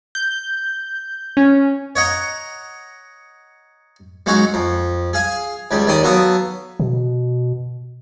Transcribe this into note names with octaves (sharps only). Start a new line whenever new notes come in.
G6
C#4
C#5 D#5 F#5 A#5
F#3 G#3 C#4 D#4 F#4
F2
G#4 F5 G#5
C#2 C#3 G3
D#2 D#3 D5 D#6
F#3 B3 A4 F5 D#6
B2